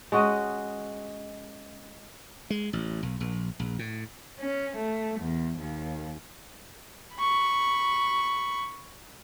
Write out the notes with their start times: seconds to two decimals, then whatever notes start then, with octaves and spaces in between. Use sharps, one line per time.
0.12 G#3 C#4 F#4 D#5
2.50 G#3
2.73 A1
3.03 B1
3.20 A#1
3.59 A#1
3.79 A2
4.40 C#4
4.76 A3
5.20 E2
5.58 D#2
7.16 B5 C#6